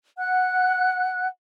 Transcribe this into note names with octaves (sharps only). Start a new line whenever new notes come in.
F#5 F#6